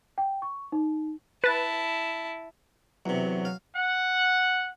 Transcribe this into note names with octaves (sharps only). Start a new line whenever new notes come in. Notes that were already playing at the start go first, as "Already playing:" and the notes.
G5
C#6
D#4
E4 B4 A5 A6
E2 C3 F#3
F5
F#5